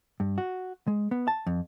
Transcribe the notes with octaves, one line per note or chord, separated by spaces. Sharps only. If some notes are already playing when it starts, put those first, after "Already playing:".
G2
F#4
G#3
B3
A5
F2